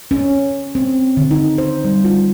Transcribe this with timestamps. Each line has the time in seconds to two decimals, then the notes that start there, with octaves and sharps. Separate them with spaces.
0.11 C#4
0.75 C4
1.17 D3
1.31 D#4
1.58 C5
1.84 G3
2.04 F4